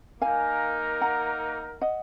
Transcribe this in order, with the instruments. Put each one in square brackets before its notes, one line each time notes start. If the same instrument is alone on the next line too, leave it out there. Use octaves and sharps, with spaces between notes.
[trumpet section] A#3 D#4 A#4 [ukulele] F5 G#5
[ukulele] F#5 A#5
D#5 F#5